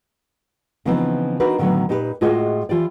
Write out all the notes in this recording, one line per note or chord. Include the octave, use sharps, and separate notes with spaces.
C#3 E3 F3 B3 C4 D#4
C4 D4 D#4 F#4 A#4 B4
A2 D3 D#3 F#3 A3 B3
A#2 D#4 G4 G#4 B4
A2 G#3 F4 F#4 G#4 D#5
E3 F4 G4 D5